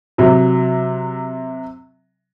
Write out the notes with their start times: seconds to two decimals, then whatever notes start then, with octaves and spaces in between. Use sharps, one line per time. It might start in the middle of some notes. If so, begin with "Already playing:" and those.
0.18 C3 F#3